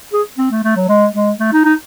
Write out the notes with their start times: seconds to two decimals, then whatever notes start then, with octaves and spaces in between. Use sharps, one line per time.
0.13 G#4
0.38 C4
0.51 A3
0.64 A3
0.76 F#3
0.88 G#3
1.14 G#3
1.40 A3
1.53 D#4
1.65 D#4